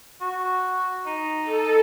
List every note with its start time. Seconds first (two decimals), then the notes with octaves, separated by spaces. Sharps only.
0.21 F#4
1.06 D#4
1.43 A4